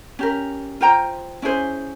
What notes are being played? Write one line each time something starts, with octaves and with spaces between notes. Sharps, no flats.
C#4 G4 A#4
F4 C5 G5 A#5
C#4 E4 G#4 C5